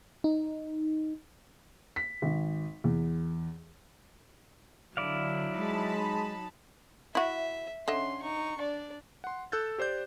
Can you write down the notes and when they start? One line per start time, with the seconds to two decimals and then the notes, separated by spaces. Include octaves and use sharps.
0.24 D#4
1.96 B6
2.22 G#1
2.84 E2
4.97 D3 F#3 E4 D5 F5
5.56 G#3 D#4 A5 B5
7.15 E4 F#4 E5
7.88 D3 C#4 D#5 E5 C6
8.22 D#4 C#6
8.58 D4 D5
9.24 F#5 C6
9.52 A4 E6 F#6 G6 A6
9.78 G4 C5 D5 G6